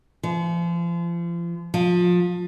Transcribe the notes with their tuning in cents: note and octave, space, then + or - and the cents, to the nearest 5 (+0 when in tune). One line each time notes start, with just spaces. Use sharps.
F3 -35
F3 +25